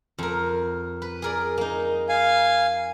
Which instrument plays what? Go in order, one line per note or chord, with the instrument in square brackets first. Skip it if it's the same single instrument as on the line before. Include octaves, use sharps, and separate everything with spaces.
[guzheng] F2 A#4
B4
G#4 A#4 D5
A#3 D#4
[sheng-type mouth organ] F5 G#5